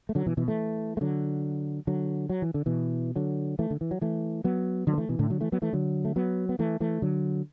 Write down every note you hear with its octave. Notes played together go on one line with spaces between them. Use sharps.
A3
D3 F#3
B2 E3
B2 E3
E3 A3
A3
D3 F#3
D3 F#3
F#3
E3
D3
B2 E3
D3 F#3
E3 A3
D3
E3
F#3
E3 A3
F#3 B3
D3 F#3
B3
E3 A3
B2 E3
A2 D3
D3 F#3
E3 A3
F#3 B3
E3 A3
D3 F#3
A3
F#3 B3
B3
E3 A3
E3 A3
D3 F#3